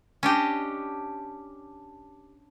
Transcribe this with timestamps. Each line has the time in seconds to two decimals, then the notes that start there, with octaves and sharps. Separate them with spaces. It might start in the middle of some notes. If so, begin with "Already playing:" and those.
0.23 C#4 D4 G4 D#5